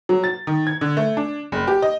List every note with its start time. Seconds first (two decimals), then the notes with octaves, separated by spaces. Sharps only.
0.09 F#3
0.24 A6
0.47 D#3
0.67 G#6
0.81 D3
0.97 A3
1.17 D4
1.52 F#1
1.68 G4
1.82 D#5